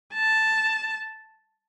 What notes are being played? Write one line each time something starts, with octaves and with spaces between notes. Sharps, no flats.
A5